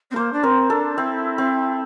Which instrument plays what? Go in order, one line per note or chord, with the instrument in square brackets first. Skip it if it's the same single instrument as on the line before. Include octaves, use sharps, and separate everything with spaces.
[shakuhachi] C4
[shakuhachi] A#3 [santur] C5
[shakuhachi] D4
[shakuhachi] C4 [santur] A#4
[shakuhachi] D4 [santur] A4
[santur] C4 [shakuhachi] E4
[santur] C4